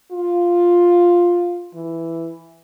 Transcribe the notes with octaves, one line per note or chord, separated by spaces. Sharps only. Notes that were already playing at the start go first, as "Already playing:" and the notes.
F4
E3